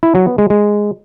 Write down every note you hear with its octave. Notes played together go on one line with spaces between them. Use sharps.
E4
F#3
B3
G#3
G#3